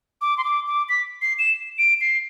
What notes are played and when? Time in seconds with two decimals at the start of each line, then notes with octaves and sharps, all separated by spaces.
0.21 D6
0.38 C6
0.44 D6
0.67 D6
0.89 B6
1.22 C7
1.39 E7
1.79 D7
2.01 C7